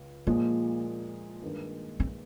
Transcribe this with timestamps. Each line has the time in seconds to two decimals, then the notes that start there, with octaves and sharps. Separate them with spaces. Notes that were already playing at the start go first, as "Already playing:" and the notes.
Already playing: C#2
0.27 A#2 F3 G#3 A#3
1.42 G2 D#3 G#3
2.00 C4